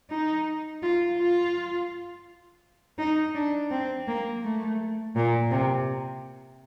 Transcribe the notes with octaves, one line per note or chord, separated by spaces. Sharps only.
D#4
F4
F4
D#4
D4
C4
A#3
A3
A#2
C3